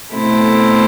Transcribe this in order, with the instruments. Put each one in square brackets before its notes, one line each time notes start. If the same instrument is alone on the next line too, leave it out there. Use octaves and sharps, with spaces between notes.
[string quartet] B2 A3 C4 E4